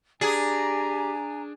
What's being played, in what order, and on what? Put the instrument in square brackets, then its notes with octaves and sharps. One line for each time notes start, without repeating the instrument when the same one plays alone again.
[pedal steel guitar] D4 [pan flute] G4 [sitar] G#4 [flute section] G#5 A#5